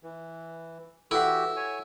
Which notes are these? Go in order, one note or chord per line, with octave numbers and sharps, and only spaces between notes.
E3
E3 E4 F#4 G4 A4 F#5
C#5 G#5